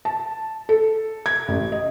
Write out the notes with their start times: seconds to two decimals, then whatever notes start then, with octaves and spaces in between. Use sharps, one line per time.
0.05 A5
0.69 A4
1.26 G#6
1.48 A1
1.72 D#5